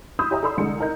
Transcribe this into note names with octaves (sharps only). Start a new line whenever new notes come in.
B5 C6 D#6 E6 G6
G4 C#5 D#5 E5 G#5 A#5
A4 D5 B5 C6 E6
C2 D3 G#3 C#7
D#4 A#4 D#5 G6